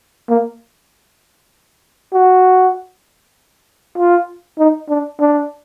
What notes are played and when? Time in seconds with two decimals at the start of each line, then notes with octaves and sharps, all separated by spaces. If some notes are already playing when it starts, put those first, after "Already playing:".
0.29 A#3
2.13 F#4
3.98 F4
4.59 D#4
4.89 D4
5.20 D4